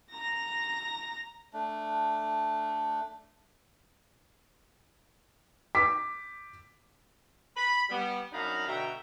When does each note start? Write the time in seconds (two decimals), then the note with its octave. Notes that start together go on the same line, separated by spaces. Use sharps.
0.12 A#5 A#6
1.53 A3 D4
5.75 D6 B6
7.56 B5
7.89 G3 B3
8.32 F#2 D4 D#4 F5 A#5 B5
8.67 B2 D3 F#4 E5 G5 A#5